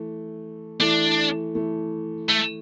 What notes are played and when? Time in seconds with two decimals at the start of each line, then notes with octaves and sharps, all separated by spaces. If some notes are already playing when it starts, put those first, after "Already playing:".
Already playing: E3 A3
0.79 E3 A3 D4
1.55 E3 A3
2.29 A3